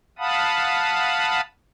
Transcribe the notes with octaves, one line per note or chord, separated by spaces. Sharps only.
F5 F#5 A5 B5 D#6